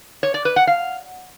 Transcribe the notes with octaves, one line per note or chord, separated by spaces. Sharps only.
C#5
D5
B4
F#5
F5